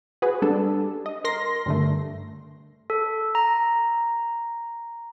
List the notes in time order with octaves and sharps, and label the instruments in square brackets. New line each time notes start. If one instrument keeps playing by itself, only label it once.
[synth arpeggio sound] F#4 G#4 B4
G3 D4 A4
D#5
A#4 C6 A#6
G2 D3 A3
[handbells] A4
A#5